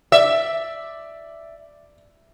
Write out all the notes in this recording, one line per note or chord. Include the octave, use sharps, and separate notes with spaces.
D5 E5